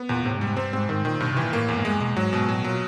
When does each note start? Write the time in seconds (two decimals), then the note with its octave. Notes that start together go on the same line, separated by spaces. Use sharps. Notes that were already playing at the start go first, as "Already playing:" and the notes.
Already playing: B3
0.09 E2 A#2
0.25 A2 C3
0.36 G#2
0.41 G3
0.47 G#2
0.57 G2 C4
0.73 G#2 C4
0.89 G#2 D#3
1.05 A#2 D#3
1.20 G2 B2
1.31 C3
1.37 E3
1.42 A#2
1.53 A2 A#3
1.68 E2
1.76 G#2
1.85 G2 G#3
2.00 B2 G#3
2.17 G#2 F#3
2.32 G#2 B2
2.49 A2 F#3
2.64 A#2 F#3